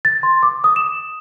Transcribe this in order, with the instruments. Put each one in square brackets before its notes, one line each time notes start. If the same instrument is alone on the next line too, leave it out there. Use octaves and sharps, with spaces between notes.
[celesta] A6
C6
D6
D#6
E7